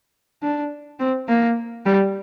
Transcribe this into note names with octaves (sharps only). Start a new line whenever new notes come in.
D4
C4
A#3
G3